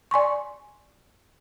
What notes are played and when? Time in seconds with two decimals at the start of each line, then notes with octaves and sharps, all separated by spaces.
0.11 D5 G#5 C6 C#6